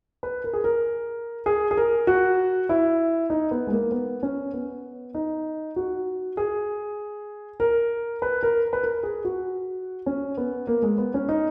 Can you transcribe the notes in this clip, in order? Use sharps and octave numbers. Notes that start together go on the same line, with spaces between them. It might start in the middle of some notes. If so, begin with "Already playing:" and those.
B4
A#4
G#4
A#4
G#4
G#4
A#4
F#4
E4
D#4
B3
G#3
A#3
B3
C#4
B3
D#4
F#4
G#4
A#4
B4
A#4
B4
A#4
G#4
F#4
C#4
B3
A#3
G#3
B3
C#4
D#4